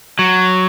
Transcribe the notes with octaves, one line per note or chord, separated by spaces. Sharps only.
F#3